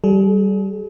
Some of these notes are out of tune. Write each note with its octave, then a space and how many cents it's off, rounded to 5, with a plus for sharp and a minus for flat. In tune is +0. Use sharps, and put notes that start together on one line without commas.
G3 -15 G#4 +45